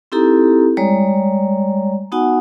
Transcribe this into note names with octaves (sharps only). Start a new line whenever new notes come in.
C4 D#4 E4 G4 A4 A#5
G3 G#3 C#5 D5 A#5
B3 D#4 F#4 F#5 G#5